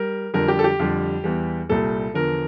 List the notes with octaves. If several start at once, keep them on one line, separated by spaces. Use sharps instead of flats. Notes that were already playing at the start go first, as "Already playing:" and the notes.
Already playing: G3 A#4
F2 D3 G3 A#4
G4
A4
G4
F2 D3 G3
E2 E3 G3
C2 A#2 G3 A4
E2 D3 F3 A#4